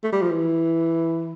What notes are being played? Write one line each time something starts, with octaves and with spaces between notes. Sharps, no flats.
A3
G3
F3
E3